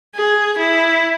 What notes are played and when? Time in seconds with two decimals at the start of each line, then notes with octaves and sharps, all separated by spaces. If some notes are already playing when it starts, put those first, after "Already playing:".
0.16 G#4
0.58 E4